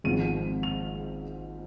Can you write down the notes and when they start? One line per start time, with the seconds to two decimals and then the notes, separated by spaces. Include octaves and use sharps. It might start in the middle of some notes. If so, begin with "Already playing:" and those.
0.04 G#1 G#2 F3 C4 D#7
0.63 F7